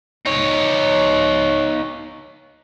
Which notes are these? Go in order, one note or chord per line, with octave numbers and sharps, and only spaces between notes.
D#4 C#5